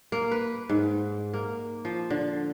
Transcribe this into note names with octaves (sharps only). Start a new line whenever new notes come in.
A#3
B4
G#2
A#3
F3
D3